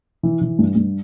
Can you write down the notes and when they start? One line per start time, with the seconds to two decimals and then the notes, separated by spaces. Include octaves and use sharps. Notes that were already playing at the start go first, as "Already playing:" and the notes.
0.23 E3
0.41 E3
0.59 G2
0.76 G2